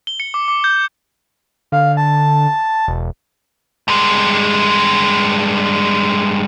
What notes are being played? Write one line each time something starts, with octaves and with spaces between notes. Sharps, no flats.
G7
C#7
D6
D6
G6
D3 F5
A5
E1
G2 G#3